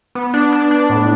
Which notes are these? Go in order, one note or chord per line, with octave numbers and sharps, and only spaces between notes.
B3
D4
D4
D4
A2